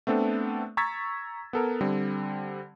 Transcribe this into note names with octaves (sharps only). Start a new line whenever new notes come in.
A3 B3 C4 D4 A4
A#5 C#6 E6 G#6 A6 B6
B3 A4 A#4
D3 G3 C4